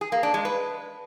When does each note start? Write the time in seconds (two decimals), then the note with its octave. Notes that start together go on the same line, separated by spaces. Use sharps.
0.01 G#4
0.12 A#3
0.23 D4
0.34 G#3
0.45 B4